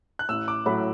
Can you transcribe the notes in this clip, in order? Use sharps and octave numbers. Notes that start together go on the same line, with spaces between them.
F#6
A1 E6
D6
A2 F#3 B5